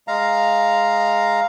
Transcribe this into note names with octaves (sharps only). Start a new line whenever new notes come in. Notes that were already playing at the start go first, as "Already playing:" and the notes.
G#3 F5 A#5